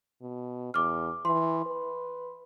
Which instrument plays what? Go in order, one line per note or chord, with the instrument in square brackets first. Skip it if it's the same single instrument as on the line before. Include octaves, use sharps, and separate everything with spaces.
[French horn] B2
[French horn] E2 [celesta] D6 F6
[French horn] E3 [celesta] C6
[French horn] B4